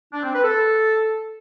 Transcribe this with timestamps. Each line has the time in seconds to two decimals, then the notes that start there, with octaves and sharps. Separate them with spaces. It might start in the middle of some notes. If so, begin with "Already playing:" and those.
0.12 D4
0.23 C4
0.33 B4
0.43 A4